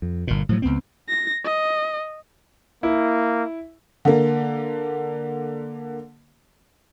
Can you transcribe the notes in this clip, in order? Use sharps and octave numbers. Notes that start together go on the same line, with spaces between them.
F2
G1 A#2
A2 F3 F#3
C#2 G2 B3 C4
A#6
D#5
A#3 E4
D3 A#3